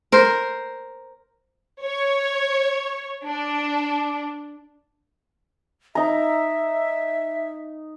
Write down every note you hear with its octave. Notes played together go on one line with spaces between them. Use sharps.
A#4 C5
C#5
D4
D#4 E5 A#5